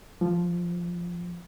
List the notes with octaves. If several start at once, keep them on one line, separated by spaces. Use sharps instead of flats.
F3